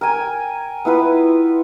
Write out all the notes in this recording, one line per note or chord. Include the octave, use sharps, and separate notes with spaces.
A#4 G5 G#5
B3 E4 F4 B4